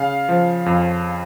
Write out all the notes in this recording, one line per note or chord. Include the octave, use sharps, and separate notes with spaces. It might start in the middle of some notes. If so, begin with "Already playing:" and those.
Already playing: C#3 F5
F3
F2